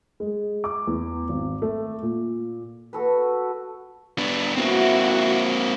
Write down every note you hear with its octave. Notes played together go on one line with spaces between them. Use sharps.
G#3
D6
E2
G#1
A3
A#2
F#4 A4 B4
B3 D4
A#3 C4 E4 F#4